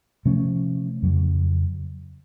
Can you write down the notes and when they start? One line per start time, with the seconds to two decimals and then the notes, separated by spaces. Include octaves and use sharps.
0.25 C3 F3 A3 C#4
1.02 F2 C#3 F#3